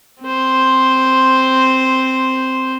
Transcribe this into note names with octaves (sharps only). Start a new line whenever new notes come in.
C4 C5